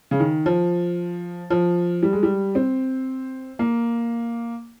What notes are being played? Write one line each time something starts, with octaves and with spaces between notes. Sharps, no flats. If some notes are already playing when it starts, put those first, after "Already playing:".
C#3
D#3
F3
F3
G3
G#3
G3
C4
A#3